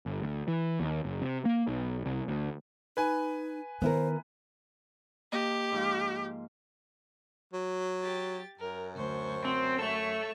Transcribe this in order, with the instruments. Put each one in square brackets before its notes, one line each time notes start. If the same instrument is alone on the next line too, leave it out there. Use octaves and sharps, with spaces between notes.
[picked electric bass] G1
D2
E3
D#2
F#1
C3
A#3
B1
C2
D2
[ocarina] D#4 [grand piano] B4 G#5
[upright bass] D#3 [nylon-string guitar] B3 E4 A#4 [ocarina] C5
[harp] A#3 D#5 [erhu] G4
[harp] G#2 F3 F5
[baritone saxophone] F#3
[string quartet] G4 A6
[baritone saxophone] F#2 [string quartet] A#4
[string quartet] D2 C5 C#6
[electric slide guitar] C4
[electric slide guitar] A3 A4 [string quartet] C#5 C#6 E6